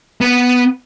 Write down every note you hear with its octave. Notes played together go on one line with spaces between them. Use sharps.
B3